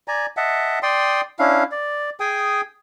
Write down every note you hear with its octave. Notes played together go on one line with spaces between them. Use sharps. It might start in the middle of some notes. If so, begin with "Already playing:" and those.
D5 G#5 A#5
D#5 E5 F#5 A5
D5 G5 C6 D#6
C#4 D4 E4 F5
D5
G#4 G5 G#5 D#6